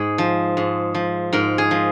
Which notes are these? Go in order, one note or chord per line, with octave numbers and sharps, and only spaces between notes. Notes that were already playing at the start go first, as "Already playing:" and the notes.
Already playing: G#2 G#4
F3
G#2
F3
G#2 A#4
G#4
F3